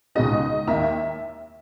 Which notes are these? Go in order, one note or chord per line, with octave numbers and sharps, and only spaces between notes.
C#2 B2 G#3 D#4 D#5
D#2 D#3 A#3 E5